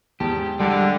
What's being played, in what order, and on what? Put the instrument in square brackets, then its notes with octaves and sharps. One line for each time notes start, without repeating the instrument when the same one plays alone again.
[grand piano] E2 G#2 A5 [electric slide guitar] G4
[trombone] D3 [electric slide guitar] G3 G#3 [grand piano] G5 A6